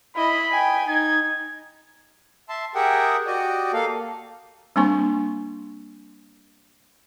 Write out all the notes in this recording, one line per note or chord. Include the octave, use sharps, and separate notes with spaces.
E4 D#5 B5
G5 G#5
D#4 G#6
E5 A5 C6
G4 G#4 A#4 E5 F#5 G5
F#4 G4 D5 D#5
A#3 A4 F5
G3 A#3 C4 D4 G#5 C#6